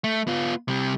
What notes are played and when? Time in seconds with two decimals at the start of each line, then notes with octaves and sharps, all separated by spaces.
0.04 A3
0.27 B3 F4
0.68 C3 G3